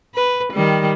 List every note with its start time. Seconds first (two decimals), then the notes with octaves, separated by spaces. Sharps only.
0.14 B4
0.53 D#3 G3